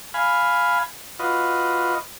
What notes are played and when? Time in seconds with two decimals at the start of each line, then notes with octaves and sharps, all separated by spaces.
0.14 F5 G#5 B5
1.19 F4 F#4 B4 D#5